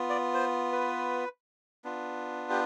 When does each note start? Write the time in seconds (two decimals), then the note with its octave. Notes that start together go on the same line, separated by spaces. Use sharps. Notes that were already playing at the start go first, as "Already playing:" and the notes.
Already playing: B3 F4
0.10 D5
0.34 C5
0.72 B4
1.85 B3 D4 F4
2.50 G4